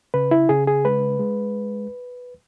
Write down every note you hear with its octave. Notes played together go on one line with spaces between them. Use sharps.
C#3 B4
E4
C#3 G#4
G#4
G#3 B4
G#3